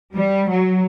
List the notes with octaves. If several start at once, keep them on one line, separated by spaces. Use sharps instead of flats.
G3
F#3